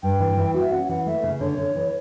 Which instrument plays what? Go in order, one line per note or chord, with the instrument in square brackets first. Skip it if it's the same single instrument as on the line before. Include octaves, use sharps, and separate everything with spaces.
[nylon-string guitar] G2 [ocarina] G5
[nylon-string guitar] E3
E3
F#4
[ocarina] E5
[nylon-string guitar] C#4 [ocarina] F#5
[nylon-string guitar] E3 [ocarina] F#5
[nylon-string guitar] A3 [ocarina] E5
[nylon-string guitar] C#3
[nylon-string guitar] D3 [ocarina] C#5
[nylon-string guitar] D3
E3